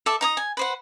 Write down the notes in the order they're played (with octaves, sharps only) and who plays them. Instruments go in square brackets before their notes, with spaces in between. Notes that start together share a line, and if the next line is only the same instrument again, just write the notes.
[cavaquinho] A4 D5 E5
D#4 A#5 D#6
G#5
B4 C5 F#5